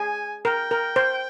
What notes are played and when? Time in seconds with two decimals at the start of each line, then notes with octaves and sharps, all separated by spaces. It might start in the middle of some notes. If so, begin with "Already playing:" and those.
Already playing: G#4 G#5
0.45 A#4 G5
0.71 A#4
0.96 C5